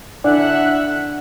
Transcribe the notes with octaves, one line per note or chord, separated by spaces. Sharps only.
D3 D4 E4 D5 E5 F#5 F#6